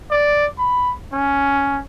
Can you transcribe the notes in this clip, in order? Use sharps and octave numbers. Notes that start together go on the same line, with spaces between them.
D5
B5
C#4